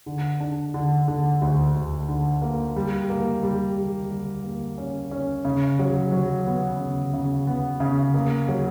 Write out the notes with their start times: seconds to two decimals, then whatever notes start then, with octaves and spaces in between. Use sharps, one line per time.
0.06 D3
0.40 D4
0.74 D3
1.08 D3
1.42 D2
1.75 D2
2.09 D3
2.42 A#3
2.76 G3
3.10 A#3
3.43 G3
3.77 G3
4.11 G3
4.44 A#3
4.78 C#4
5.11 C#4
5.45 C#3
5.79 F#3
6.12 F#3
6.46 B3
6.79 C#3
7.14 C#3
7.47 B3
7.80 C#3
8.14 A#3
8.48 F#3